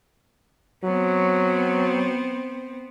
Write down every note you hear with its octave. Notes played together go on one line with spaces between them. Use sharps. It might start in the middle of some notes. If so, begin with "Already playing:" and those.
F#3 B3 C4